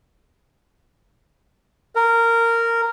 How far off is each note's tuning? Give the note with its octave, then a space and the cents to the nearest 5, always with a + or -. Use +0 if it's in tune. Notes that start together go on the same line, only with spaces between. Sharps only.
A#4 -15